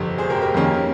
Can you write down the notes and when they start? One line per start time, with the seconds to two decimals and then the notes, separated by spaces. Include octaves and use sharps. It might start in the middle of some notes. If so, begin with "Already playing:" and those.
Already playing: G1 F2 C3
0.18 G#4 C5
0.30 G4 A#4
0.42 G4 A#4
0.54 F2 D#3 A#3 C#4